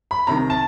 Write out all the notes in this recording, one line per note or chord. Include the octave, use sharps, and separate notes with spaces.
B5
C2 C3 D#3 A#5
A5